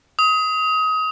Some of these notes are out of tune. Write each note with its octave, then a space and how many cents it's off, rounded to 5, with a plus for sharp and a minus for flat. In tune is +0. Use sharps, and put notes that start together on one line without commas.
D#6 +25